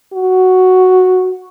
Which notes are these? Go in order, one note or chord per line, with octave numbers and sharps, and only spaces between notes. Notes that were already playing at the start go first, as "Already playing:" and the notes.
F#4